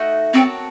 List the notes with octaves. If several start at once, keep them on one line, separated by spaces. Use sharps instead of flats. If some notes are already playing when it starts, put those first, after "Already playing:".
Already playing: A3 D#4 F#4
C4 F#4 A#4 C#5 A5